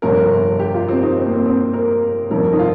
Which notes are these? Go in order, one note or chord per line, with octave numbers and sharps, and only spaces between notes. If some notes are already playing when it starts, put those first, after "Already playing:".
G1 F2 C3 G3 A#4
G4
F4
C4
D#4
C4
A#3
C4
C4
A#4
G1 F2 C3 D#3 G3 A#4
D#4
F4